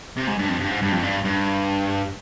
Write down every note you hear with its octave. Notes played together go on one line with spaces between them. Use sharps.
C3
G#2
G2
F2
G2
G#2
G2
F2
G2
G2